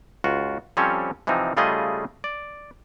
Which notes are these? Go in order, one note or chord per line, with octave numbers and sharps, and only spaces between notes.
C#2 F4 F#4
F3 G3 C4 C#4 A4 C#5
C3 E3 F3 C4 D#4
C#3 G3 A3 F4 G#4 D#5
D5